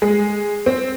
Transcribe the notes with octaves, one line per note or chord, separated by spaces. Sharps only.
G#3
C4